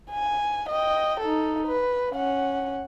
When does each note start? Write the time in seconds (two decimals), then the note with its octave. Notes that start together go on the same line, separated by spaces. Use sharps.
0.11 G#5
0.69 D#5 G5
1.20 D#4 A4
1.67 B4
2.11 C#4 F#5